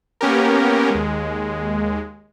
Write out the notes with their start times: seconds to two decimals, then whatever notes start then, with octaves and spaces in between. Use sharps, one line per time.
0.21 A#3 B3 C#4 G4 A#4
0.91 D#2 G#3